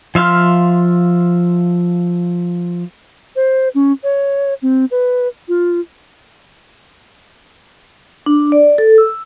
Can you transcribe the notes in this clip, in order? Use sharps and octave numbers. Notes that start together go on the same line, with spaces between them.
F3 E5 F5 C6 F6
C5
C#4
C#5
C4
B4
F4
D4
D5
A4
E6